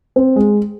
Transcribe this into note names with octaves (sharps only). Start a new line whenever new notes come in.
C4
G#3